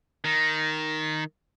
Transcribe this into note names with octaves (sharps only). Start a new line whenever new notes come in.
D#3